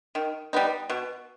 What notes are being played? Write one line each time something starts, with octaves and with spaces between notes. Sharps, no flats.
D#3
G3 B3 D#4
B2